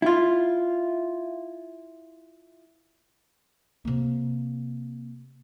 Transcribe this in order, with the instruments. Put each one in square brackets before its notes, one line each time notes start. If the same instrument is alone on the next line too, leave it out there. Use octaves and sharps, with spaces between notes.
[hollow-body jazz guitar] E4 F4
[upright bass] C3 A#3